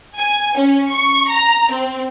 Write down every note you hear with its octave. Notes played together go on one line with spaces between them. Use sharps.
G#5
C#4
C#6
A#5
C4